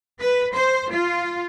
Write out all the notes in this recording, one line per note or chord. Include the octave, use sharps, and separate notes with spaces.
B4
C5
F4